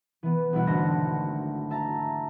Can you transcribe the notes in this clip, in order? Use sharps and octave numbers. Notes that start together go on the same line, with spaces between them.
E3 B3
B1 G3 E4 F#5
G#1 D3 A3 F#4 A#6
E5 A5 A#5